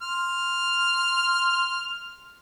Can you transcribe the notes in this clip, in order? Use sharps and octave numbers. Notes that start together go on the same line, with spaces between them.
C6 F6